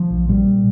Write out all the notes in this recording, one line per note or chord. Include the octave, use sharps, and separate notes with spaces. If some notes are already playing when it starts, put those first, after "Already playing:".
Already playing: F3
A#1
A#2 G3